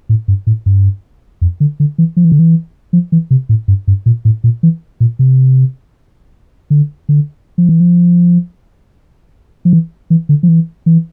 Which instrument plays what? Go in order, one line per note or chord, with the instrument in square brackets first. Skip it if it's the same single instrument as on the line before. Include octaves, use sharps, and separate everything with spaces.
[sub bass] A2
G2
A2
G2
F2
D3
D3
E3
F3
E3
D3
E3
F3
E3
C3
A2
G2
G2
A#2
A2
A#2
E3
A#2
C3
D3
D3
F3
E3
F3
F3
E3
E3
D3
F3
E3
E3